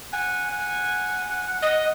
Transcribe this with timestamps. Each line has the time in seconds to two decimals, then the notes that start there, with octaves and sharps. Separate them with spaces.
0.13 F#5 G#5
0.51 F#5
1.62 D#5